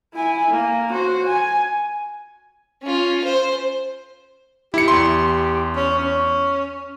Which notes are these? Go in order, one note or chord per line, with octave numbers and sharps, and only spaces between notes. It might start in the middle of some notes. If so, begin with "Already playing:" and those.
E4 G#5
A#3
F#4 C5
G#5
C#4 F4
C5
E4 G4 C#7
E2 C6
C#4
C#4